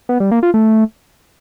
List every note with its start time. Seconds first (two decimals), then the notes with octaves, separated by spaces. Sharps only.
0.09 B3
0.20 G3
0.31 A#3
0.43 F4
0.54 A3